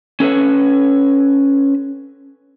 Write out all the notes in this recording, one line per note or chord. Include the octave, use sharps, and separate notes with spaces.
C#4 A4 B4 C#5